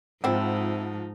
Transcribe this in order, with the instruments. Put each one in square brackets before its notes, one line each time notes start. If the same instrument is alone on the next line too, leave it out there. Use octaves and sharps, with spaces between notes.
[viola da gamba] G#2 D#4 [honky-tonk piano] F3 F#5 [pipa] C4 E4